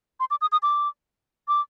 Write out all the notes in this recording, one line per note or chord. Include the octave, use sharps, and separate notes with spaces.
C6
D6
D#6
D#6
D6
D6